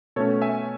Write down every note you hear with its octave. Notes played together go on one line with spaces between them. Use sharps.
B2 A3 C#4 A4 C#5
E5 G#5